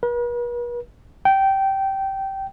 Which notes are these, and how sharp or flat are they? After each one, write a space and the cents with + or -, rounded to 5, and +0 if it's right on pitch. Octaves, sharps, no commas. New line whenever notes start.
B4 -45
G5 -15